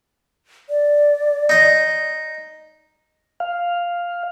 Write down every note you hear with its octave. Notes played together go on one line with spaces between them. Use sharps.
D5
D#4 D#5
F5